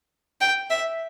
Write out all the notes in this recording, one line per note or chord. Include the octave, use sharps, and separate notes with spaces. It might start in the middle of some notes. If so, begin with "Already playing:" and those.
G5
E5